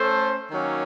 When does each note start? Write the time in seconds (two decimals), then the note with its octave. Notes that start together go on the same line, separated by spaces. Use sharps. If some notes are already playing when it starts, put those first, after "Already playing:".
Already playing: A3 C#4 A4 C5
0.50 D#3 F#3 A#3 C#4